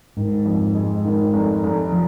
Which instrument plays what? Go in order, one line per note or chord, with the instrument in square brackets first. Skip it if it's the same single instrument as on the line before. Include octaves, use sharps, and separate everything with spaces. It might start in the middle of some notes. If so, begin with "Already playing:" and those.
[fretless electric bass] G#2 [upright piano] D#3
[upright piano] F2
G#3
D#3
F1
F1
[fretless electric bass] F3